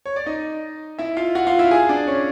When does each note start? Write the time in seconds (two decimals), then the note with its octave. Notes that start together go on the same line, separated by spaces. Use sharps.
0.06 C#5
0.16 D5
0.26 D#4 D#5
0.99 E4 E5
1.17 F4 F5
1.35 F#4 F#5
1.47 F4 F5
1.59 E4 E5
1.71 G#4 G#5
1.89 D4 D5
2.07 C#4 C#5